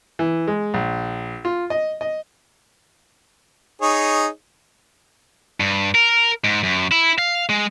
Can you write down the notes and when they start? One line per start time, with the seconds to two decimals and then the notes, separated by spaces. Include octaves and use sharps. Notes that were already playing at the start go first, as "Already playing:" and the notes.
0.19 E3
0.47 G#3
0.74 A#1
1.45 F4
1.70 D#5
2.01 D#5
3.82 D#4 G#4 C#5
5.60 G2
5.95 A#4
6.44 G#2
6.63 F#2
6.92 E4
7.19 F5
7.49 G#3